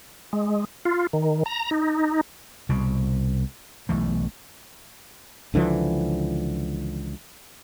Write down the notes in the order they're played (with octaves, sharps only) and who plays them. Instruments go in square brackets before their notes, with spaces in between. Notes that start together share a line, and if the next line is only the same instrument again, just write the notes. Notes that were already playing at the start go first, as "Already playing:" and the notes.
[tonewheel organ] G#3
F4
D#3
A#5
D#4
[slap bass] C2 B2
B1 E3 A3
[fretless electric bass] C#2 D3 E3 F3